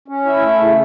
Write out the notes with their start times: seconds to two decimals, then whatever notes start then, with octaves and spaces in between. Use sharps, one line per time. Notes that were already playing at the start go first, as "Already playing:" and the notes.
0.08 C#4
0.25 E4
0.42 A3
0.60 C#3